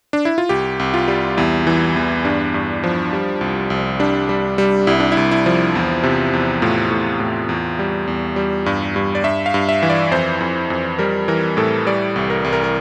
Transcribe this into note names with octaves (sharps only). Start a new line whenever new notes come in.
D4
E4
F4
C2 G4
C2
F4
G3
E2 E4
E3
E2
G2 D4
G2
F3
G3
C2
C2
G3 D4
G3
G3
C2 E4
D4
E4
C2
E4
F3
E2
C3
E2
A2 F4
A2
A2
E2
G3
E2
G3
G2
G2
D5
G2 E5
F5
G2
E5
E3
D5
F2 C5
F2
F2
G3 A#4
E3 A#4
A2 A4
G3 D5
C2
A#4
C2
A#4
A#4